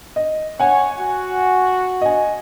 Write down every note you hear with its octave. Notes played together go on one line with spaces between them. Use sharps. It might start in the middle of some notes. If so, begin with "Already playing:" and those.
D#5
C#5 F#5 G#5
F#4
D#5 G#5